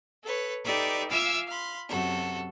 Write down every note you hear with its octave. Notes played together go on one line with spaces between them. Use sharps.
A4 B4 C#5
D#4 G4 A4 B4 D5 E5
F4 E5 F5 G#5 D6 E6
F5 B5 C6
F#2 C3 F#4 A4